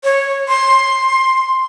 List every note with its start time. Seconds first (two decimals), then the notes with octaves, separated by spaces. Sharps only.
0.04 C#5
0.48 C6